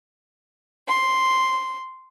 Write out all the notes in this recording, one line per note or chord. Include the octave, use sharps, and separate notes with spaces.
C6